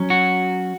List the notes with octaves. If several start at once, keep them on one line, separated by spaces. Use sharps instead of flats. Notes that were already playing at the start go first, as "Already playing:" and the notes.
Already playing: F#3 C#4
F#4